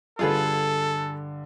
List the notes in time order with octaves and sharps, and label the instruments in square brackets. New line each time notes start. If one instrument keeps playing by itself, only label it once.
[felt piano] G2 D3 [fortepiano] F4 G#4 B4 [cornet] A4